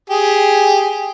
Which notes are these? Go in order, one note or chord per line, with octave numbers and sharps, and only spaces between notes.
G4 G#4